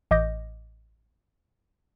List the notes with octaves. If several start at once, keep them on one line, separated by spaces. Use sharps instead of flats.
A1 D#5 D6 G6 A#6